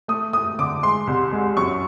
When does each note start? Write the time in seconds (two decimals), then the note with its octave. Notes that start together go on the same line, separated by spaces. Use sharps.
0.08 A3 D#6
0.33 A3 D#6
0.59 D3 D6
0.83 G#3 C6
1.07 C2
1.32 G#3
1.57 F#2 C#6